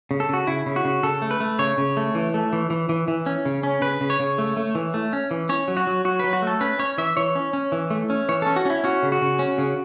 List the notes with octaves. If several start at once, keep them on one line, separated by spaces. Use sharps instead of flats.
C#3
A4
C#3 F#4
C#3 E4
C#3
F#4
C#3
C#3 A4
A3
B4
A3
C#3 C#5
C#3
A3
E3
A3
E3
E3
E3
E3
C#4
C#3
C#4
C#3 B4
C#3
C#5
C#3
A3
A3
E3
A3
C#4
E3
C#4 C#5
F#3
F#4
F#3
F#3 F#4
F#3 B4
F#4
A3 A4
C#4 B4
C#4 C#5
E3 E5
E3 C#5
C#4
C#4
E3
A3
C#4
E3 C#5
C#4 A4
F#4
C#4 E4
C#4 F#4
C#3
F#4
C#3
C#4
C#3